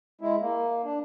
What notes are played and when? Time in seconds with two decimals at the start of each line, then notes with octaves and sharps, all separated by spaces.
0.21 G#3 E4
0.41 A#3
0.84 D4